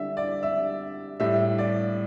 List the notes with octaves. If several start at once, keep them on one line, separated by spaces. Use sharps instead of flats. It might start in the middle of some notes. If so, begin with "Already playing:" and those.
Already playing: D3 G3 E5
D5
E5
A2 G3 E5
D5